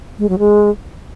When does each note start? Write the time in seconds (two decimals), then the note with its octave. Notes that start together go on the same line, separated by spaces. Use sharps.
0.19 G#3
0.29 F#3
0.39 G#3